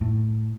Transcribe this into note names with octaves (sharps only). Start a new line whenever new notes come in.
A2